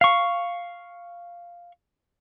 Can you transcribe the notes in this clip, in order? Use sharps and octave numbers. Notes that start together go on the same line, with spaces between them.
F5 C#6